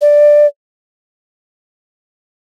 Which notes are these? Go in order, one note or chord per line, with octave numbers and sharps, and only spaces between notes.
D5